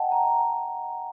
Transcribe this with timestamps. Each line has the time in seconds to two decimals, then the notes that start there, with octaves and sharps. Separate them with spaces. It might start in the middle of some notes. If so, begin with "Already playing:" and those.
Already playing: D#5 F#5 G5 A5
0.12 G5 A#5